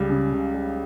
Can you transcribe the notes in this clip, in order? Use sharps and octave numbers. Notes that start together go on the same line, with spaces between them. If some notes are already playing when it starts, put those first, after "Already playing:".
Already playing: C#2 G3
C#3
C#3
G3